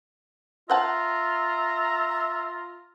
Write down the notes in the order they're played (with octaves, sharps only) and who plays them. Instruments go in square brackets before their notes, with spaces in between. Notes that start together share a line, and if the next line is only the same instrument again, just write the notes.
[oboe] F4 [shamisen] C5 F#5 A5 [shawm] E5 [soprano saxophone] A#5